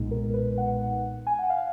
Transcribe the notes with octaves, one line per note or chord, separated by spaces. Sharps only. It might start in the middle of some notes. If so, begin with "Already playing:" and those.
Already playing: B1 A#2 G#3 B3 D#4
A#4
B4
F#5
G#5
F#5
F5